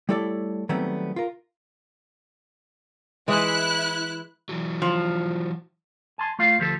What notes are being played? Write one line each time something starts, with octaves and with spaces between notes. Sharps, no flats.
G3 A3 E4 A4 C#5 D5
D#3 F#3 G3 A3 B3 C4
F4 A#4
E3 G#3 E4 F#6
E3 F#3
F3
G#5 A5 C6
A3 F4 F5
D2 F3 G4 A4